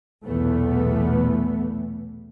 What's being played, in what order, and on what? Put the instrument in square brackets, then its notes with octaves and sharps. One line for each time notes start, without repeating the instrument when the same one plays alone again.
[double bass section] B1 E2 A#2 E3 A3 B3